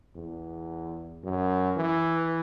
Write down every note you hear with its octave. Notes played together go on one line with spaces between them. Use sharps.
E2
F#2
E3